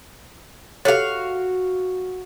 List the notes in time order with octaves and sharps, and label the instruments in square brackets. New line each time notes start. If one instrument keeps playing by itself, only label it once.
[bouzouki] F#4 F5 [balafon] G4 A4 C#5